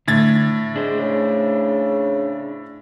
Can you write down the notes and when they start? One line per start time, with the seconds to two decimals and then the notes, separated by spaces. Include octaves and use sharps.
0.08 A2 D3 G#6 A6
0.76 G#3 D4 C5
1.00 C#3